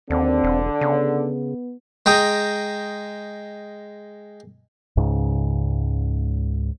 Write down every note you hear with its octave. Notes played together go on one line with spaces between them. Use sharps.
D#2 D3 C4
E1
C#3 B3
G#3 G5 A#5 D#6
C#2 G#2 C#3